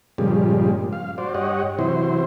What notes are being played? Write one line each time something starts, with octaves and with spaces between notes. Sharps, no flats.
G2 A#2 C#3 F3 G3 G#3
F5
F#4 C5 D5
G2 G4 C#5 D#5 F#5
C3 E3 F#3 E4 C5